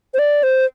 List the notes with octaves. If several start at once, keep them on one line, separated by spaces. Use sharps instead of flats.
C5
D5
C5